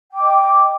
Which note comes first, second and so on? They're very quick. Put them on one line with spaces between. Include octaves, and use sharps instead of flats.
G5 D6 D#5